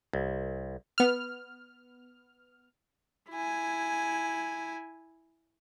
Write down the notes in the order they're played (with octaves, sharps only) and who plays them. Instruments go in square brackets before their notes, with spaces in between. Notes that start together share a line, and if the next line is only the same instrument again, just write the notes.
[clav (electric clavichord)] C2
[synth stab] B3 F6
[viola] E4 G#5